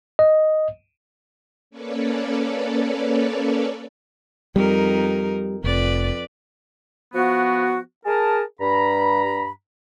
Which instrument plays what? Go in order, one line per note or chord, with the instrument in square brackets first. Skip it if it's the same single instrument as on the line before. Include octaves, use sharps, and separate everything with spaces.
[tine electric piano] D#5
[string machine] A#3 C#4 A4 B4 C#5 D5
[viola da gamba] F2 D#4 A#4 [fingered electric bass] G3
[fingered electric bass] F1 [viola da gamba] F2 B4 D5
[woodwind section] F3 B3 F#4
G#4 A#4 A5
G2 A#5 B5